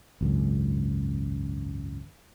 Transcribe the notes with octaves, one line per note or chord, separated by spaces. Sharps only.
G#1 C#2 F#2